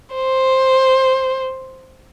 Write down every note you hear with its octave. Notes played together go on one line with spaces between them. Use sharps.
C5